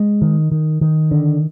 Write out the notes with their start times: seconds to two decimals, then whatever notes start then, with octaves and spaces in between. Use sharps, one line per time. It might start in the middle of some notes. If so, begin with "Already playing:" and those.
Already playing: G#3
0.22 D#3
0.52 D#3
0.81 D#3
1.11 D3